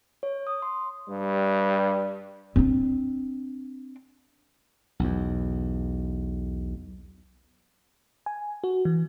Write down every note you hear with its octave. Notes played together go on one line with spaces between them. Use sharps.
C#5
D#6
C6
G2 G3
C4 D4
B1 E2
G#5
F#4
E3